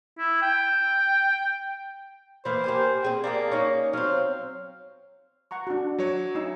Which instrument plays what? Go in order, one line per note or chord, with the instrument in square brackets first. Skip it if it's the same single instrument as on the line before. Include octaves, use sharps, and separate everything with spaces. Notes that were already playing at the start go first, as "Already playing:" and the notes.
[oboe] E4
G5
[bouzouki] E3 A#3 [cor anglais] C5
[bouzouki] A#3 G4 G#5
C4 G#4 G5
[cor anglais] A#3 [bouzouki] D4 G#4 F5
[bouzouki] C#4 D#4
[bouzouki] F#3 C4 [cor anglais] F5
[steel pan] F#5 A#5 C#6
D4 F#4
[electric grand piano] F#3 C#5
[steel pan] D#4 E4 E6